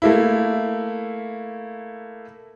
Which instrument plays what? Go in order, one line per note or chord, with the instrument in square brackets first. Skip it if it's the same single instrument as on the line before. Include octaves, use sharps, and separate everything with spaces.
[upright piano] A3 A#3 E4